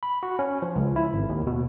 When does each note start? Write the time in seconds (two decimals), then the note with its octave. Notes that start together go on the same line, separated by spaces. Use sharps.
0.03 B5
0.23 F#4
0.39 C#4
0.62 F3
0.76 C#2
0.96 E4
1.13 G#1
1.29 D#2
1.47 B2